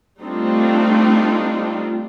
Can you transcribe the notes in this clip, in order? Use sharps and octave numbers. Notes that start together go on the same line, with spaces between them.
G3 A3 C4 D4 D#4 F4